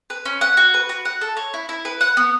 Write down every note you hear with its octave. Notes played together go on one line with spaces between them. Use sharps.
B4
C#4
F#5
F#4
B4
F#4
F#5
A4
C#5
E4
E4
B4
F#5
B3